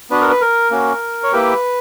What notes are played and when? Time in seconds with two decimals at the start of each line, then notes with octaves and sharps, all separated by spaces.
0.10 B3 D4 F#4 B4
0.21 A#4
0.31 B4
0.41 A#4
0.71 A#3 C#4 F#4
1.23 C#5
1.33 A#3 E4 G4 B4